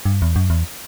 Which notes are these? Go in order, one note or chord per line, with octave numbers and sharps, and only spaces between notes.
G2
E2
F#2
E2